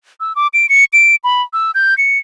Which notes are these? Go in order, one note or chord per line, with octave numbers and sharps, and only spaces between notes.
E6
D6
D7
C#7
D7
B5
E6
G6
C#7